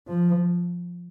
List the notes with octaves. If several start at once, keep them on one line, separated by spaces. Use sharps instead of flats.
F3